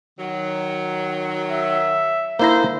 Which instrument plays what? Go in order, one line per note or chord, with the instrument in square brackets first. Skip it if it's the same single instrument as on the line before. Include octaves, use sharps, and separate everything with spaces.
[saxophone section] D#3 F#3
[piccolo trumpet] E5
[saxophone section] D3 D#4 C5 [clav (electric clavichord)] A#3 E4 A#5